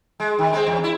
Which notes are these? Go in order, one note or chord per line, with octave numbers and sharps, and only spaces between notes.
G#3
D#3
G#3 C4
E2
E4